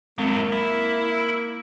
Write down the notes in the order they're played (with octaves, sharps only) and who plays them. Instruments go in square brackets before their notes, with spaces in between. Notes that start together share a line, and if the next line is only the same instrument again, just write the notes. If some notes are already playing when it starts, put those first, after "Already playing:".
[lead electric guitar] F#3 E4 [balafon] G#3 C4 [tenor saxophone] A#3
[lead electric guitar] E4